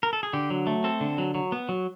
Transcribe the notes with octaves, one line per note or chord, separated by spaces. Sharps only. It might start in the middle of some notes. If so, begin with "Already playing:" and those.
A#4
A4
G#4
D3 G4
F#3
A3
C4 A4
D3
F#3
F#3
B3
F#3